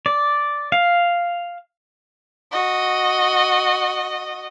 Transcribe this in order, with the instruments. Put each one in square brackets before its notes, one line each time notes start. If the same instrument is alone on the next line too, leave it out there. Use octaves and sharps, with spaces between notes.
[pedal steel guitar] D5
F5
[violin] F#4 D#5